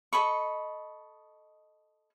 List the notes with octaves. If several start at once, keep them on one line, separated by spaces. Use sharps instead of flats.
A4 D#5 B5 C#6